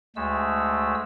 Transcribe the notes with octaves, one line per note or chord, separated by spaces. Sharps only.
D2 G#3 A3 E6